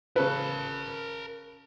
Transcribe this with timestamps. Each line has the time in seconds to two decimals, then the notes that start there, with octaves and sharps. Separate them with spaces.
0.16 C#3 A#4 B4 A5